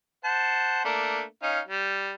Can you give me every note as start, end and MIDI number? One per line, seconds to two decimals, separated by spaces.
0.25 0.82 72
0.25 0.82 78
0.25 0.82 81
0.85 1.22 57
0.85 1.22 58
0.85 1.22 62
1.42 1.60 61
1.42 1.60 63
1.42 1.60 77
1.68 2.14 55